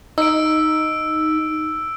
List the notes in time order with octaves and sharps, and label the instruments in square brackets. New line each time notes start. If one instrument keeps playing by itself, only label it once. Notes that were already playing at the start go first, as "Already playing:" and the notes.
[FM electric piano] D#4 [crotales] E6 D7